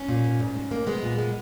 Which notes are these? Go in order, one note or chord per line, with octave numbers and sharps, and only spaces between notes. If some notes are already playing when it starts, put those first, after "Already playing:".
Already playing: C#4
A#2
G#2
G#2
G#2
A#3
G#3 B3
A#2
G#3